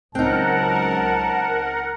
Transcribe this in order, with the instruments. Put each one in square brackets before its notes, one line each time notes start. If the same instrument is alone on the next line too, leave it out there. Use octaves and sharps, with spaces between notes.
[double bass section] C#2 F#3 [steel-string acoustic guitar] C4 D#4 [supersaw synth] A#4 F#5 [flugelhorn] A5